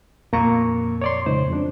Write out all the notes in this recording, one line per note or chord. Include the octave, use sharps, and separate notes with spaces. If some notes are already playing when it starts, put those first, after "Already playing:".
F2 A#2 A#3 A#5 C#6
C#5 D5 C6
C#2 D#4 C5
F2 D4